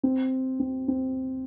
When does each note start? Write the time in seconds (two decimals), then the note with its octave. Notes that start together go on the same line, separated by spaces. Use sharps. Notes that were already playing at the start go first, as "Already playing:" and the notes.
0.03 C4
0.60 C4
0.88 C4